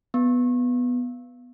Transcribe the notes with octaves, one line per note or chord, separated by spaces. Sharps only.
B3